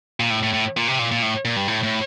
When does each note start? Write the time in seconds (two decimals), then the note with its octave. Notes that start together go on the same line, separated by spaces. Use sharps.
0.20 A#2
0.30 A2
0.43 A2
0.54 A2
0.77 A#2
0.88 C3
0.99 A#2
1.11 A#2
1.22 A2
1.45 A#2
1.56 G2
1.68 A2
1.83 A2